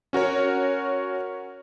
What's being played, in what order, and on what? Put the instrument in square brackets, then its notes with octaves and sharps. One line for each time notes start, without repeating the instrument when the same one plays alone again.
[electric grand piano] C#4 F#4 A#4 C#5